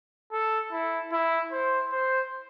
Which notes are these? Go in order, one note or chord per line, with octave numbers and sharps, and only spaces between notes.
A4
E4
E4
C5
C5